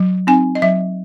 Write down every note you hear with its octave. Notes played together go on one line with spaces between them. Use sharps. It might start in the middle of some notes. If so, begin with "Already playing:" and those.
Already playing: F#3
C4 D#4 G#5
D#5
F#3 E5